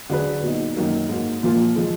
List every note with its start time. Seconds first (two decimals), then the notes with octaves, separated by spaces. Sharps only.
0.10 D3 F#3 D4 G#4 B4
0.43 A#2 F#3 B3 D#4
0.76 F#2 D#3 F#3 A#3
1.09 G#2 F#3 A#3
1.43 A#2 F3 A#3 F4
1.76 F3 G#3